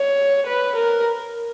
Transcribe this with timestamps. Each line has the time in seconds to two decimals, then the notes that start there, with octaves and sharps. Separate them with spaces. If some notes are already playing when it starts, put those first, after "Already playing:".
Already playing: C#5
0.46 B4
0.76 A#4